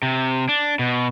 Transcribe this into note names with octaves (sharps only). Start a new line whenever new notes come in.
C3
D4
B2